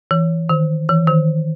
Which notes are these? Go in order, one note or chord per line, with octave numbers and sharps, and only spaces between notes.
E3
D#3
E3
D#3